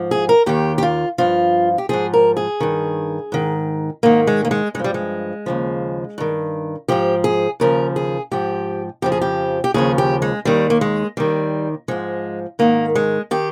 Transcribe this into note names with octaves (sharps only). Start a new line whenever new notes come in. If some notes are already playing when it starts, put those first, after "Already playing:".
Already playing: G#2 F3
G#4
A#4
D#2 D#3 G4
G4
F4
G2 F3 F4
G4
G#2 F3 G#4
A#4
G#4
G2 D#3
G#2 D#3
G#2 D#3 A#3
G#3
A#3
G#3
G2 F3 G#3
G3
G#3
D#2 C#3 F3
G2 D#3
G#2 F3 G4
G#4
D#2 C#3 F3 A#4
G#4
G#2 F3 G4
F2 C#3 F3 G4
G#4
G4
G4
D#2 C#3 F3 G#4
G4
G#3
D#2 D#3 G3
A#3
G#3
D#2 D#3 G3
G#2 F3 G#3
G#2 D#3 A#3
G#3
D#3 G4